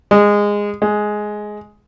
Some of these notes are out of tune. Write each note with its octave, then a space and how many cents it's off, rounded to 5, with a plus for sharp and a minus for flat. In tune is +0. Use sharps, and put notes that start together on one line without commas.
G#3 -15
G#3 +10